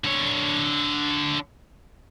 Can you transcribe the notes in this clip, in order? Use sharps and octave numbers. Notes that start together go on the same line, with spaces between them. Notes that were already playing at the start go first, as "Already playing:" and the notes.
D3 C#5